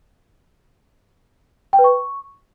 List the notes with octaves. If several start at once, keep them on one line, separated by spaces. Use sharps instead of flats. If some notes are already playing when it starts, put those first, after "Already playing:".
G5
B4
C#6